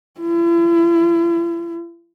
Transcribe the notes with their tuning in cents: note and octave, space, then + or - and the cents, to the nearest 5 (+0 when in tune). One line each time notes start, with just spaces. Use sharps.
E4 +45